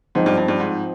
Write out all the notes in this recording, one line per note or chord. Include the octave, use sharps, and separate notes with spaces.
G#2 F3 C4 D#4
G2
G2
G2
G#2